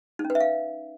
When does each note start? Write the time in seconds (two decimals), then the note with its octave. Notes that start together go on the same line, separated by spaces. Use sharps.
0.19 D#4
0.25 C#4
0.30 B4
0.35 E5
0.40 F5